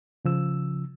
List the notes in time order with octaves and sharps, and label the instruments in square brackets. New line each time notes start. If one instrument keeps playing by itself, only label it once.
[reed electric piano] C#3 F3 E6